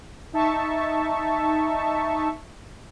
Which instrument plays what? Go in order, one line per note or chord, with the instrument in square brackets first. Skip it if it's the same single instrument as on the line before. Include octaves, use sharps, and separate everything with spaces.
[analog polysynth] D#4 E5 A5 C#6